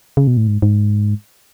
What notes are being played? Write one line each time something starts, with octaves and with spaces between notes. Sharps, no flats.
C#3
B2
A2
G#2
G#2